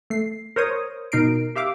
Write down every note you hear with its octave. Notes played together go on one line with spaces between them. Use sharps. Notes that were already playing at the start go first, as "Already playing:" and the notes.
A3 C7
A#4 C5 C#5 D#6
B2 D#4 A#4 C7 D7
G4 E5 F5 D6